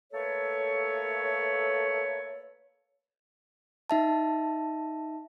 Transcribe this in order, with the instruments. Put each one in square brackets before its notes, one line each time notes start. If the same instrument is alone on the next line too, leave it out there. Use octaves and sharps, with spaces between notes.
[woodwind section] A3 A#3 A4 B4 C#5
[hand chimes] D#4 E5 A5